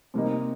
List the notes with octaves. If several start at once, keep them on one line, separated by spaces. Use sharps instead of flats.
C3 G3 A#3 D#4